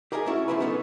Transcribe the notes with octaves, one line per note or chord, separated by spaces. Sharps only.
G4 G#4 A#4 D#5 F5 G#5
A3 C#4 E4 F#4
C#3 F3 A#3 E4 A#4 B4
B3 C#4 D#4 F#4 A4